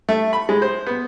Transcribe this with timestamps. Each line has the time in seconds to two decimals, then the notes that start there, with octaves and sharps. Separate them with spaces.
0.09 A3
0.33 B5
0.49 G#3
0.62 C5
0.87 B3